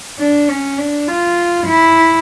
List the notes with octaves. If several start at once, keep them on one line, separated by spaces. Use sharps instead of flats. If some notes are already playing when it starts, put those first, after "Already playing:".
D4
C#4
D4
F4
E4